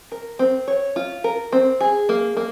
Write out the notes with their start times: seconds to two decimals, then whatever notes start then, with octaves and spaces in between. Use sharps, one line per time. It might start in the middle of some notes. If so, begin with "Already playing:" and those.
0.12 A#4
0.39 C4
0.68 C#5
0.96 F4
1.24 A#4
1.53 C4
1.81 G#4
2.09 A#3
2.37 A#3